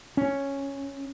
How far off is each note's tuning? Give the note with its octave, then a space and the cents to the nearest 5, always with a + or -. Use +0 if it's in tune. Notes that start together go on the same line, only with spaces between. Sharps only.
C#4 -5